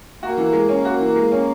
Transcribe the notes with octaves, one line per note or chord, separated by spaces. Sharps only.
A#3 F#4
E3
G#3
C#4
F#4
E3
G#3
C#4